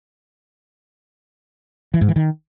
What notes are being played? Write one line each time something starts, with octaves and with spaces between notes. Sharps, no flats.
E3
G#2
E3
D#3